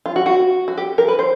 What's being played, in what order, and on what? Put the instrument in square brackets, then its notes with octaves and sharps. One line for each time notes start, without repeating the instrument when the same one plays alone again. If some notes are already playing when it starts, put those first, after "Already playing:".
[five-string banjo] F4
F#4
F#4
F#4
G4
A#4
B4
C5